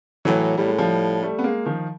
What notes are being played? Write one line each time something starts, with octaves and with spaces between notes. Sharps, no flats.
A2 E3 F#3
A2 G3
G#3
F3 G3
G3 A3
B3
G#3 A#3
D#3 F3